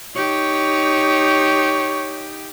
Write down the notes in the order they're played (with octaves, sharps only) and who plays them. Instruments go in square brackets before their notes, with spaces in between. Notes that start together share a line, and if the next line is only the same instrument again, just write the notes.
[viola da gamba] D#4 G4 [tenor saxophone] C#5